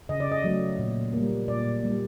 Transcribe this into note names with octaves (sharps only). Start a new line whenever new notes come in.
C#3 D#5
D5
D#5
F#3 A3
A#2
G3 A#3
A#2 D5
G3 A#3